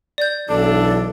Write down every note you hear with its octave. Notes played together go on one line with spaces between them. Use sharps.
D5 G6
B1 E3 D4 A4